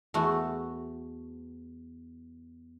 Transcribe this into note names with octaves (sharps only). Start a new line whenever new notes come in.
E2 A3 B3 F#4